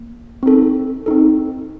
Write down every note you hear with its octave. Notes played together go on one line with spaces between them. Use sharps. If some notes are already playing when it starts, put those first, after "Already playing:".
Already playing: A#3
C4 D#4 A4
C4 D#4 A4